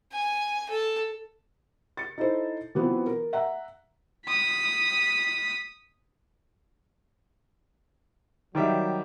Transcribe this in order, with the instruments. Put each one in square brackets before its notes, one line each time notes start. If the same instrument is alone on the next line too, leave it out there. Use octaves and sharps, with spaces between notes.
[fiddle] G#5
A4
[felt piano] A6 C#7
D#4 E4 A4 C5
E3 F#3 B3 C4 F4 B4
A#4
E5 F#5 A#5
[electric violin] D#6 B6
[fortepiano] D#3 G3 E5 [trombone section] F#3